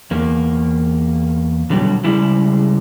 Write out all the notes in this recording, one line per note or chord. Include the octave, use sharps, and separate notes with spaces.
E2 A#3
B2 D3 F#3 G3
C#3 G3 G#3 E4